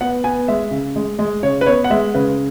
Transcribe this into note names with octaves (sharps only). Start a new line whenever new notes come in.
B3 F#5
B3 G#5
G#3 E5
C#3
G#3
G#3
C#3 C#5
B4
B3 C#5
F#5
G#3 E5
C#3 B4